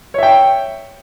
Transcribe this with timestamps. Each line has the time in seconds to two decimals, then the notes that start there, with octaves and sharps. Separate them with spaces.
0.14 C#5
0.18 E5
0.23 G5